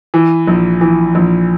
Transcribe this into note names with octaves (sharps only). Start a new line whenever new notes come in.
E3
A#1
E3
A#1